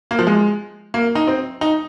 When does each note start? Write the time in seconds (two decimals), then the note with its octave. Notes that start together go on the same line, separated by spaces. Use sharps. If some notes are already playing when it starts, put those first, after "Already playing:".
0.11 A#3
0.19 F3
0.27 G#3
0.94 A#3
1.15 D#4
1.27 C4
1.61 D#4